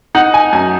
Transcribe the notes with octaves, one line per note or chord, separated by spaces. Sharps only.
D#4 F#5
G#5
F#2 G#5